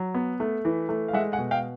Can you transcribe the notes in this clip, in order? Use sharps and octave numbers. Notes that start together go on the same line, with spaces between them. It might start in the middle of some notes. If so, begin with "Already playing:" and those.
Already playing: F#3
B3
A3
E3
A3
F5
G#3 E5 F#5
F#5 G#5
B2
F5 G5